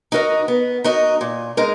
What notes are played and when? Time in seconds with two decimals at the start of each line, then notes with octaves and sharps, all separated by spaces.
0.12 D#4 F#4 A#4 D#5
0.48 B3
0.84 D#4 F#4 A#4 D#5
1.21 A#2
1.57 G#3 D#4 A#4